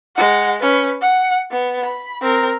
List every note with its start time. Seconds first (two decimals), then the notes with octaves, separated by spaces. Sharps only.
0.16 G#3 F#5
0.60 C#4 B4
1.01 F#5
1.51 B3
1.83 B5
2.22 C4 A#4